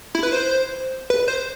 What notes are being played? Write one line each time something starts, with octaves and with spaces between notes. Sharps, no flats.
E4
B4
C5
B4
C5